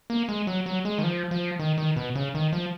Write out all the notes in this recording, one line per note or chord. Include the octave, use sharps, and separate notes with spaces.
A#3
G#3
F#3
F#3
G#3
D#3
F3
F3
D#3
D#3
B2
C#3
D#3
F3